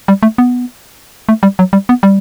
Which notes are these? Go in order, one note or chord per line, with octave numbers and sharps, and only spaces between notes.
G3
A3
B3
A3
G3
F#3
G3
B3
G3